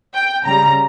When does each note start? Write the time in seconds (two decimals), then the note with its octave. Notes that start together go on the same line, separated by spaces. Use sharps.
0.14 G5
0.46 C#3 G3 A#5